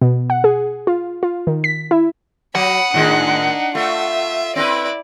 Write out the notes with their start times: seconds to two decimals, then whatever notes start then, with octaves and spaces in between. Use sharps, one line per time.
0.02 B2
0.30 F#5
0.44 G#4
0.87 F4
1.23 F4
1.47 D#3
1.64 B6
1.91 E4
2.55 F#3 F#5 B5 D#6
2.94 A2 D#3 G#3 D4 D#4
3.75 A3 F4 E5
4.56 C4 D#4 E4 B4 D5